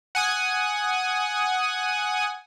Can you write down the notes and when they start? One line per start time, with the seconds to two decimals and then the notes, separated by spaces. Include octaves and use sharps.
0.15 F#5 G#5 D#6